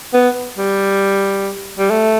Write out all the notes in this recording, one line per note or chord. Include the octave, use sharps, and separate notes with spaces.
B3
G3
G3
A3